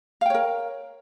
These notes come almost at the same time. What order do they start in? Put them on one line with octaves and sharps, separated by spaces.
F5 G5 C#5 A#4